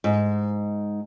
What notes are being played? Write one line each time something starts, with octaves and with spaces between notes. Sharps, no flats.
G#2